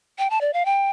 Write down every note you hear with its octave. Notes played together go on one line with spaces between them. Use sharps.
G5
A5
D5
F5
G5